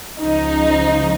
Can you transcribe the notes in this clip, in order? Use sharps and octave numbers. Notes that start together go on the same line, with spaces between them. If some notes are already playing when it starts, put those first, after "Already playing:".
C#2 C#3 F3 D#4